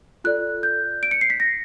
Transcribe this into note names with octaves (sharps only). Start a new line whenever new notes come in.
F4 A4 D5 F#6
G6
D7
C#7
C7
B6
A#6